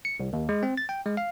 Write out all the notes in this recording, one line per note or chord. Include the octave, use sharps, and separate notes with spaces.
C#7
C2
D#2
G#3
C4
A6
G5
G#3
F5